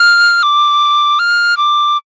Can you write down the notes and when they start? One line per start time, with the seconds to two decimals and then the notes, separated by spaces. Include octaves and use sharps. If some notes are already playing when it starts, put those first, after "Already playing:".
Already playing: F6
0.43 D6
1.19 F6
1.57 D6